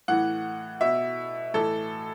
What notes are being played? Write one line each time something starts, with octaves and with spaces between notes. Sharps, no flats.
A2 E3 F#5
B2 E5
A2 E3 A4